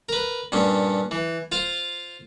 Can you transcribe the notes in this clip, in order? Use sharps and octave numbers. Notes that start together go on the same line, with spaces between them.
A#4 B4
G2 A#2 C#4
E3
F4 C5 F5